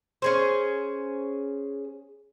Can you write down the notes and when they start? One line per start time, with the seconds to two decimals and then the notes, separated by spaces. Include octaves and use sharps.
0.22 C#4 G#4 C5